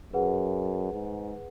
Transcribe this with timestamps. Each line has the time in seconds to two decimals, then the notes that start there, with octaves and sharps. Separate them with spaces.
0.13 F#2 G#4 B4 F#5
0.93 G#2